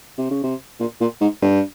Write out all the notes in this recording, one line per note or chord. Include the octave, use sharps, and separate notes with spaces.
C3
C#3
C3
A#2
A#2
G#2
G2